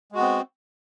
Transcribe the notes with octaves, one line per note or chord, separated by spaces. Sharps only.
G#3 B3 C4 F#4